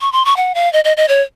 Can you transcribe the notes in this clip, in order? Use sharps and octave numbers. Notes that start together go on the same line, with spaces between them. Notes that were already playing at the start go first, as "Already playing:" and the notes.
C#6
C6
C#6
F#5
F5
D#5
D#5
D#5
C#5